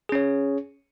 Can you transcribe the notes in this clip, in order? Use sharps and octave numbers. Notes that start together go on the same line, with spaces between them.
C#4 G#4 C#5